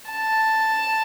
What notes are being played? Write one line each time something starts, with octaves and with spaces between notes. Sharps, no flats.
A5